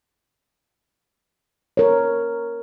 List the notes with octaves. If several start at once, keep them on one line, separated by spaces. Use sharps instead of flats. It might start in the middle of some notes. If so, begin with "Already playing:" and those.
A#4 C#5